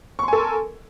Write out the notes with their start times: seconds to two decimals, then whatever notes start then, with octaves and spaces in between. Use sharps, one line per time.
0.19 C#6
0.23 C6
0.28 G#5
0.33 A4
0.37 A#4